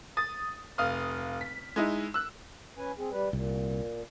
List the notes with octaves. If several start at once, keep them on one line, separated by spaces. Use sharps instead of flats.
D#6 A6
F1 F5 D#6 F6
B6
G#3 D#4 E4
E6 F#6
C#4 B4 G#5
C4 G#4
G3 B4
C2 A#2